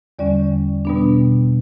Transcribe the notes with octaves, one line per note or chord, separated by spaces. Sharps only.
E2 D3 G3 C#4 D5
B2 G3 B3 D4